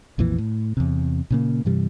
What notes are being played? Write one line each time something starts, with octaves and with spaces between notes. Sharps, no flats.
B1 F2 A#2 E3
A2
E2 C3
A#2 C#3 A#3
G2 C3 E3 G3